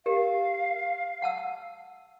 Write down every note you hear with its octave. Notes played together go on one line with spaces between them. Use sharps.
G4 A#4 F5
F#5 A5 E6